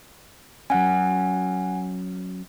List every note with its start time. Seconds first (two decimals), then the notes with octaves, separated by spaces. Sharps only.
0.70 F#3 C#4 F#5 G#5